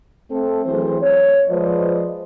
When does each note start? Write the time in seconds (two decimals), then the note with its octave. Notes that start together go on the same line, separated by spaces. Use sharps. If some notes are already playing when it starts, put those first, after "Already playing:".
0.30 A3 C4 A4
0.66 E3 F#3 A3 C4 G#4 C5
1.02 C#5
1.49 F3 G#3 B4 C5 D5 D#5